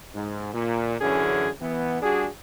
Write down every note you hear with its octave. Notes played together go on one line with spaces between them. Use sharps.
G#2
A#2
F#2 D3 E3 C#4 G#4
E3 B3
G3 D4 F#4 G#4